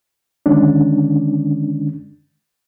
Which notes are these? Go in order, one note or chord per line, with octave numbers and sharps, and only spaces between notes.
D3 D#3 G#3 C#4 D4